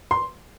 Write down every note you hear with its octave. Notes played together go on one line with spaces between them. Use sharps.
C6